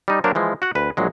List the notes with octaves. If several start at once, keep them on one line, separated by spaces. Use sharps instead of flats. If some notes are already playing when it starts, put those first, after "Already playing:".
G3 D#4
F#3 A#3 D4 A#4 C5
E3 F3 G#3
F#4 F#5
D2 B4
A#1 F#3 G#3